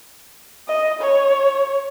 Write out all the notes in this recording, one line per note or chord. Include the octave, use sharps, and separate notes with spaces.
D#5
C#5